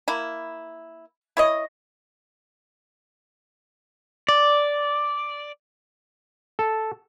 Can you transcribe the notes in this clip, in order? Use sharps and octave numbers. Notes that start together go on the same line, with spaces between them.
A#3 E4
E4 C#5 D#5
D5
A4